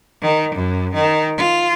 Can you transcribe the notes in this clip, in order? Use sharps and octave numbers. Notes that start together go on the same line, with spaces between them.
D#3
F#2
D#3
F4